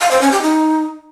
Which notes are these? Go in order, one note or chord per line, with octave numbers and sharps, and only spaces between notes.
F5
C5
C#4
G4
D#4